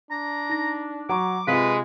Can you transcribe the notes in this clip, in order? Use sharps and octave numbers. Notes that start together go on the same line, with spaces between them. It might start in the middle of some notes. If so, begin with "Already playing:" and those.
D4 A#5
D#4 A#6
F#3 F#5 A#5 C#6 D6
C3 G#3 F4 B4 F5 B6